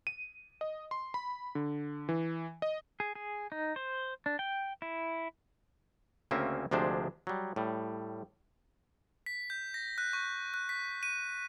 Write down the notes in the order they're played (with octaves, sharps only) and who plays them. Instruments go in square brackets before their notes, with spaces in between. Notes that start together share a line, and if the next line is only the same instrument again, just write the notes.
[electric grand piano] D#7
D#5
C6
B5
D3
E3
D#5
[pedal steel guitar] G#4
G#4
D#4
C5
D4
G5
E4
[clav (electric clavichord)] D2 C#3 A#3 C4 C#4 E5
D2 C3 F3 G#3 D4 C5
F#3 G3
A2 G3
[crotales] B6
G6
A#6
F#6
C#6
F#6
B6
D#7